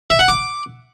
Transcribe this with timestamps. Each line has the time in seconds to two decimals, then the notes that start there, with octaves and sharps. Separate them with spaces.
0.10 E5
0.19 F#5
0.28 D6